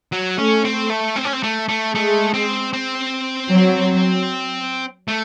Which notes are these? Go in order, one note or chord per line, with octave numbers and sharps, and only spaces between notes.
F#3
A3 C#4
C4
A3
C4
C#4
C4
A3
A3
G#3 A3
C4
C4
F#3
A3